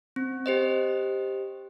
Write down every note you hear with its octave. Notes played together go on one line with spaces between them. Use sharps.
C4
G4 C5 D#5